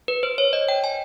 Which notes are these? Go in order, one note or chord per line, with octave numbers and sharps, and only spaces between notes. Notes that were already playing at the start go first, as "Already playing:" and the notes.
B4
C5
C#5
D#5
G5
G#5